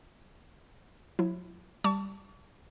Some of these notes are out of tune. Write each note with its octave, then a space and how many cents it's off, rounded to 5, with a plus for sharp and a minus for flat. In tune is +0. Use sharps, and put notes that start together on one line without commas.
F#3 -45 E4 +10
G3 +0 A5 +15 C#6 +40